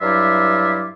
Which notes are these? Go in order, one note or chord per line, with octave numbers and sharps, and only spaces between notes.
G2 F#3 E4 F4 E5 D6